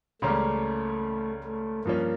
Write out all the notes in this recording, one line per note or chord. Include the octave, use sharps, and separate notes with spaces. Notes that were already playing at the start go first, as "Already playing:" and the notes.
C#2 C#3 G3 A3 A#3 C#4
A3
G2 F3 A#3 C#4